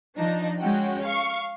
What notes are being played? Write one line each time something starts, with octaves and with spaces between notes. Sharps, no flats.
F3 D4 D#4
G#3 C#4 F#4 G5
F5 C#6